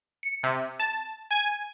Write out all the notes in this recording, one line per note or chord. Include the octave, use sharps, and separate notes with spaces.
C#7
C3
A5
G#5